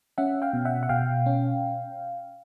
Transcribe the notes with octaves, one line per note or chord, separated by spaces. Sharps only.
C#4 E5 F#5
F5 G5
B2
E5 F#5
F#5
B2 F5 G5
C#4